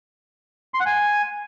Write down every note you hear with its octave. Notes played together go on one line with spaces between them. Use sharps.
C6
F#5
G#5